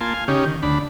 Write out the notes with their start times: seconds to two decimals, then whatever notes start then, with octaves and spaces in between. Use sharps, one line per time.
0.01 A#3 F4 G#5 A5 C6
0.14 F5 G#5
0.28 C#3 C#4 D#4 G4
0.45 D#3
0.63 D2 D4 B5